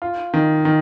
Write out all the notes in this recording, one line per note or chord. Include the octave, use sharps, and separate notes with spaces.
F4
D#3
D#3